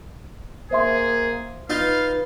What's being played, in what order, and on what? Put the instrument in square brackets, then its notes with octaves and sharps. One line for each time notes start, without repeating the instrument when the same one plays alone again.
[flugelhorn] A#3 [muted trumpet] G#4 [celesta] C5 E5 C6
[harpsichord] D#4 F4 [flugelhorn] B4 [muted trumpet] F5